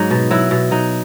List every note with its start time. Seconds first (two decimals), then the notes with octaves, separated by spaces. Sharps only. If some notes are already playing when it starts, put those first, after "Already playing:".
Already playing: G#2 F#3 D#4
0.10 B2
0.31 F#3 E4
0.51 B2
0.71 F#3 D#4